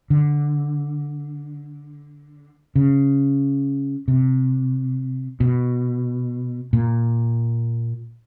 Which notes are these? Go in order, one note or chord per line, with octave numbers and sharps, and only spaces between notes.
D3
C#3
C3
B2
A#2